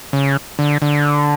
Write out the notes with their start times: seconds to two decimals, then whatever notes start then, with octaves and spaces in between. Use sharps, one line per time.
0.13 C#3
0.59 D3
0.82 D3